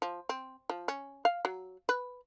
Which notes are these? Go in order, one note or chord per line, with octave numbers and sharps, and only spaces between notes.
F3
C4
F3
C#4
F5
F#3
B4